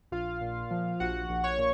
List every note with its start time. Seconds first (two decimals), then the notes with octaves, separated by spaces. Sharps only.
0.12 A#1 F4 F5
0.41 A#2
0.71 F3
1.00 A#1 F#4 F#5
1.29 A#1
1.44 C#5 C#6
1.58 A#2